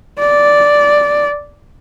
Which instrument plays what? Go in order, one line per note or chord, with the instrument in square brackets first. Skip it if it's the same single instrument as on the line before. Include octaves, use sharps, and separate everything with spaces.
[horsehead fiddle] D5